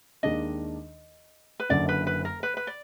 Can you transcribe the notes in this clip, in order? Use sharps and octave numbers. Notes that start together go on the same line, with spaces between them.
D#2 D#3 G#3 D4 D#5
B4
F#1 F#2 D3 D5
B4
B4
A#4
B4
B4
D5